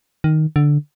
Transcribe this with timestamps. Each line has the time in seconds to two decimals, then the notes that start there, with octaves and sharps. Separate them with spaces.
0.24 D#3
0.56 D3